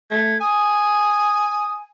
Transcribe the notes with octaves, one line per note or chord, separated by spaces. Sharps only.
A3 G#6
G#5 D#6